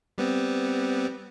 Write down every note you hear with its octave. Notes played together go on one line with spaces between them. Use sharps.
G3 B3 C4